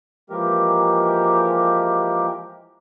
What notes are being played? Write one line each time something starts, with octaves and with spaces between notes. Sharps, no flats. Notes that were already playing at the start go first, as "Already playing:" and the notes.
E3 F3 G#3 A#3 G4 A#4